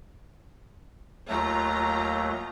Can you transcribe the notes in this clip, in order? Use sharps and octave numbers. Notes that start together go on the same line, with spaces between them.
D#2 F#3 A3 F4 A#5